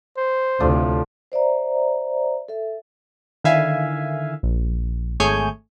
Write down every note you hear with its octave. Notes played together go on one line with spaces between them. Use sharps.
C5
D2 A2 C3 F3 D5
C5 D5 E5 A#5
A4 E5
D3 D#3 E4 E5 F5 G#5
A#1
G#1 A3 G#4 C#5 G#5 G6